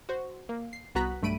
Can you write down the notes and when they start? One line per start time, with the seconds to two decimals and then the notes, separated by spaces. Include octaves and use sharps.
0.09 F#4 C5
0.49 A#3
0.73 C7
0.95 C2 B3 F#4 A#5 F#6 B6
1.22 B1 G2 A3 B5 D7 D#7